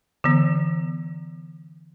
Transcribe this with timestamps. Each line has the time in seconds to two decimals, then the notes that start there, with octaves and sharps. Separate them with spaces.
0.24 D3 E3 B3